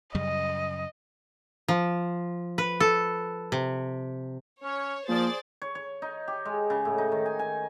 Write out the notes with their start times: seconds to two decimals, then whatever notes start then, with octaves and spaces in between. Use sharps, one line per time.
0.15 F#2 C#3 G3 D#5
1.68 F3
2.58 B4
2.80 A4
3.52 C3
4.64 C#4 C#5
5.09 F3 A#3 G#4 C5 D5 A6
5.62 C#5
5.75 C#5
6.02 D#4
6.28 G4
6.45 G#3
6.70 C#3
6.85 A2
6.98 D#4
7.12 D#3
7.26 G#5
7.39 G#5